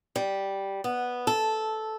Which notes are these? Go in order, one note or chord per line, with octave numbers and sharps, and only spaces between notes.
G3
B3
A4